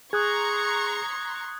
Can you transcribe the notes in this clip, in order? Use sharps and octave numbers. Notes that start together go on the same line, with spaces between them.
G#4 A#5 C6 C#6 D#6 F#6 G#6